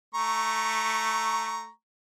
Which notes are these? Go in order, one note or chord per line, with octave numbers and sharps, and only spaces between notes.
A3 A#5 C#6